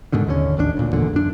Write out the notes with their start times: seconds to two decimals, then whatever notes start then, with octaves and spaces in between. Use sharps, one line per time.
0.12 G#2 B2 D3 D#3
0.27 D#2 D3 E3 C#4
0.57 A1 D#2 G#3 D4
0.77 D2 A#2
0.93 G#1 E2 A#2 D3
1.13 F#2 D4